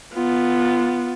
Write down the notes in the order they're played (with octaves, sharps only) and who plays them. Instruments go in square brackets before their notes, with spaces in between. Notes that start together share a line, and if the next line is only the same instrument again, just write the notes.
[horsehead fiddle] B3 F4